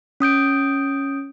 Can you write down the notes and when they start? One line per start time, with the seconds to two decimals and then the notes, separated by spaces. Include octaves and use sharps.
0.20 C#4 D#6 G6 D7